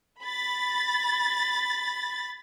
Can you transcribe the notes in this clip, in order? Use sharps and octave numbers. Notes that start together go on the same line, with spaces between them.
B5 A6